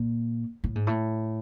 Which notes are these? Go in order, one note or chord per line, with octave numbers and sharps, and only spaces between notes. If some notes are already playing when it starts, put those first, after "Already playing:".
Already playing: A#2
A2
G#2
A2